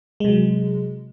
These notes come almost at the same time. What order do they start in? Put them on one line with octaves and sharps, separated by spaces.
G#3 C3 F#3